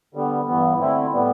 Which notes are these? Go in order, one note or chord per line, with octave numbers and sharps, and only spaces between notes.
D3 G3 B3
G2 E3 B3
D3 A3 C4 E4
A2 G3 B3